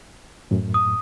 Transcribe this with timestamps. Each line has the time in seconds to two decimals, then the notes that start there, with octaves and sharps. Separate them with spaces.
0.51 F#2 A2
0.74 D#6